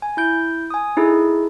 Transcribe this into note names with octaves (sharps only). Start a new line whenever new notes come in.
G#5
E4 G6 D7
G#5 D#6
D#4 E4 G#4 A4